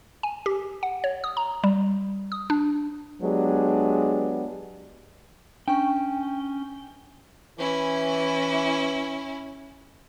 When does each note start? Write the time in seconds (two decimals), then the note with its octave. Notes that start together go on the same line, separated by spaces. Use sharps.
0.23 G#5
0.46 G4
0.83 F#5
1.04 C#5
1.24 D#6
1.37 A#5
1.64 G3
2.32 D#6
2.50 D4
3.22 F#3 G#3 B3 D4 G4 G#4
5.68 C#4 D4 G5 G#5 C#6
7.58 E3 C#4 E4